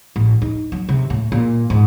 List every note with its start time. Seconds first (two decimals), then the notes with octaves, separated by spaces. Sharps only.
0.16 A1
0.42 D#4
0.72 F#3
0.89 C3
1.10 A2
1.32 A#2
1.70 G#2